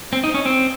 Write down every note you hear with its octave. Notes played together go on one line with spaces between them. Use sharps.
C4
D#4
C#4
C4